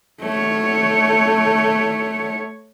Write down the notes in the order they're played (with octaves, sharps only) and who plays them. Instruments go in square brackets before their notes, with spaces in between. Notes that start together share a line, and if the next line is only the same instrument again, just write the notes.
[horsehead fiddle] A3 C#5